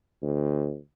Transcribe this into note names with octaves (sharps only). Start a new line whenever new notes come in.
D2